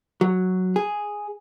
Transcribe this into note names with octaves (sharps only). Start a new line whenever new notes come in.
F#3
G#4